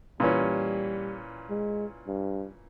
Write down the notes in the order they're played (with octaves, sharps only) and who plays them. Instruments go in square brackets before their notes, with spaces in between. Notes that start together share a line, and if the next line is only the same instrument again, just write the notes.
[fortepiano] A#2 E3 C#4 [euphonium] G3
[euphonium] G#3
G2